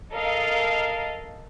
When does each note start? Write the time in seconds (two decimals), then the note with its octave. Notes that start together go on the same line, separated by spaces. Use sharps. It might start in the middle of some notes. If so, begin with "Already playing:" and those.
0.12 A4 A#4 D#5 F5